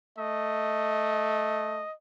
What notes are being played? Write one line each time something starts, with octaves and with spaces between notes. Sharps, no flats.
A3 D#5